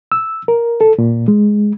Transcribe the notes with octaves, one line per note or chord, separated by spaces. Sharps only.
E6
A#4
A4
A#2
G#3